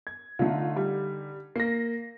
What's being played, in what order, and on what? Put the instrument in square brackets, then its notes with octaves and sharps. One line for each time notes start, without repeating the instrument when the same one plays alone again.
[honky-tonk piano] G#6
[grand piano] D3 D#4 [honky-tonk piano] A3 F4
[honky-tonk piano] G3
[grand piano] A#3 [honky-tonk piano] A#6 C7